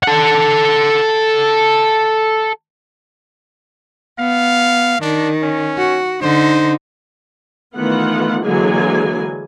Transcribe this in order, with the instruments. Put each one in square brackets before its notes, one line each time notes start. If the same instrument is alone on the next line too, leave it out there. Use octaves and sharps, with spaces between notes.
[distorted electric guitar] A4 F#5
[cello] B3 [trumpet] F5
[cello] D#3 [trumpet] D4
[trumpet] C#4
[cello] F#4
[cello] D3 D#4 [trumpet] C5
[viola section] D#3 E3 A3 B3 F4 F#5
D3 E3 F#3 G#3 A#3 G#5